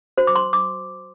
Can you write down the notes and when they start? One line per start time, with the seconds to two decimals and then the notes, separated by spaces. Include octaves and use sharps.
0.18 F#4 C5
0.27 D6
0.35 C6
0.53 D6